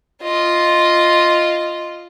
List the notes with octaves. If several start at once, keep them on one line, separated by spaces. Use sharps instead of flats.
F4 D#5